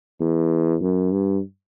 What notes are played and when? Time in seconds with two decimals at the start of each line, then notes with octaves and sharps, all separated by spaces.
0.20 E2
0.81 F#2
1.12 G2